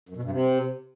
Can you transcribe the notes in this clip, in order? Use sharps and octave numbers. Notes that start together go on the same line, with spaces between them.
F#2
B2
G2
C3